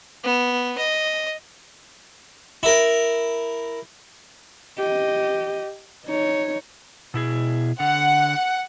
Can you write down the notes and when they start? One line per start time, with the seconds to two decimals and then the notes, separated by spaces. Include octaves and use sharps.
0.24 B3
0.77 D#5
2.63 E4 A#4
4.77 G4 D#5
6.06 D#4 C#5
7.14 B2 E4 G#4
7.80 D3 F#5